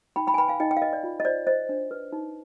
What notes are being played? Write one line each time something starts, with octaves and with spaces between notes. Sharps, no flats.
D#4 G5 B5
G5 B5
G#5
B4 G5 B5
F5 G#5
D#4 D#5 G5
D#5 G5
F5
B4 D#5
D5
F4
D#5
C5 D5
C5 D#5
D4
B4
D#4